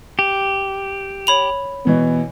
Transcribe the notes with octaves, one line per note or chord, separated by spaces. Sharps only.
G4
C#5 B5 F7
B2 E3 B3